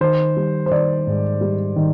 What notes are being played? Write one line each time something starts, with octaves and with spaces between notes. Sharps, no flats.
D#3 C5
G3
C5
D#3 D5
G#2
G3
D#3